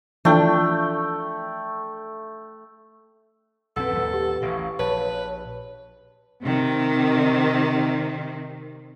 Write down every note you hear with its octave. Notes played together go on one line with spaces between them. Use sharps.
E3 F3 A3 D4 F4 G5
B1 F#2 C4 A4 B4 F#5 E6
D#2 A#2
G4
A1 A2 F5 C#6
A#1 B4 C#5 A5
C3 D#3